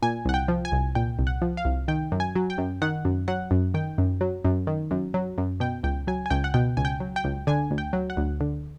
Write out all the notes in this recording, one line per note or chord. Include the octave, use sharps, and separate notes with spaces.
A#2 G#5
C2 F#5
G5
F3
G#5
C2
A#2 G5
C2
F#5
F3
F5
C2
D#3 G5
F#2
G#5
F#3
G5
F#2
D#3 F#5
F#2
F#3 F#5
F#2
D#3 G5
F#2
F#3
F#2
D#3
F#2
F#3
F#2
B2 G5
C#2 G5
F#3 G#5
G#5
C#2 G5
F#5
B2 G5
C#2 G#5
G5
F#3
G5
C#2
D3 G#5
D2
G5
F#3
F#5
D2
D3